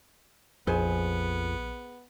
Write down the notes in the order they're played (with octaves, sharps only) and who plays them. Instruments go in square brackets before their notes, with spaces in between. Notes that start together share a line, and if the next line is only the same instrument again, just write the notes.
[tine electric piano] A#1 [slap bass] F2 [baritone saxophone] B3 [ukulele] G#4 C5 G#5